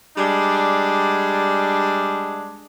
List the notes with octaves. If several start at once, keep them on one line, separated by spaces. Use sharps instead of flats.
G3 G#3 D4